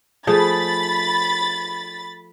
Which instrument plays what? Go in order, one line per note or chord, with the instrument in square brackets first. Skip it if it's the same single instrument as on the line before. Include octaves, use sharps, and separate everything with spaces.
[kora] F3 A3 G#4 [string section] B5 A6